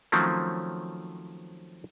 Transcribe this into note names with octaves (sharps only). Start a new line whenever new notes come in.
D#3 F3 F#3 A3 C4 C#4